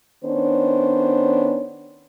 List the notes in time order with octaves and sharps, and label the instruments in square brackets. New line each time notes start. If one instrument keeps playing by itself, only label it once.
[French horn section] D#3 B3 C#4 D4 C5 C#5